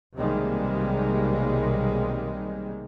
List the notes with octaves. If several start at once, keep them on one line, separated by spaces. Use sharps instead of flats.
B1 C3 D#3 G3 G#3 A#3